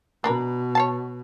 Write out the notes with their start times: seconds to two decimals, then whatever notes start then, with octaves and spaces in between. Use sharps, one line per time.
0.24 B2 D4 A#4 B4
0.75 C#5 F5 A5